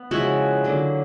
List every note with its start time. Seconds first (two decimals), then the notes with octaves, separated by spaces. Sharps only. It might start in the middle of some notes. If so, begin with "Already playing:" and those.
Already playing: B3
0.11 C#3 F3 G#3 E4 F#4
0.64 D3 F#3 A#3